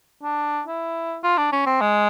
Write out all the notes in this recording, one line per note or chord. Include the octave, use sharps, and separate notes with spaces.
D4
E4
F4
D4
C#4
C4
G#3